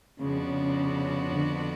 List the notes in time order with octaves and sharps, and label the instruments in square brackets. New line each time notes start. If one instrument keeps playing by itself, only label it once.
[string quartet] F2 F3 B3 D4 F#4 [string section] C#3
[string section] C#3
D3